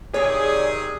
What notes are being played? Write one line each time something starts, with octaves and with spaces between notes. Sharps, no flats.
C3 D#3 G#4 C#5 D5